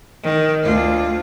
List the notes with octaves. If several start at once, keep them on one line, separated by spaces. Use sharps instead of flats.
D#3
D2 F4